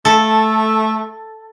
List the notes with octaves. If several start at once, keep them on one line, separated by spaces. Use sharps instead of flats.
A3 A4